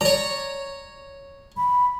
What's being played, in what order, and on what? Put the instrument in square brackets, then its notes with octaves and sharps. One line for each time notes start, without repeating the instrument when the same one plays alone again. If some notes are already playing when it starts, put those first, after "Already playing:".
[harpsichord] C#5 A#5 [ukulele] D5
[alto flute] B5